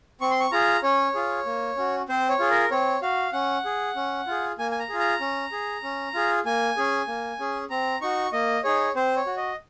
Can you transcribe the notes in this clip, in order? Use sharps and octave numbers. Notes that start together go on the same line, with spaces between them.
C4 C#6
C6
C#6
F4 G#4 A#5
C#4 C#5
F4 G#4
A#3
C#4 F#4
C4 C5
C#5
F4 G#4
A#4
C4 C#5
F#4 F5
C#4 F#5
G#4
C#4
F4 G#4
A#3 G#5
G#5
A#5
F4 G#4
A#5
C#4
G#4
C#4
F4 G#4
A#3 G#5
C#4 G#4
A#3
C#4 G#4
C4 A#5
D#4 F#4 C#6
A#3 D#5
D#4 G#4 C#5
C4 C5
C#5
F#4
D#5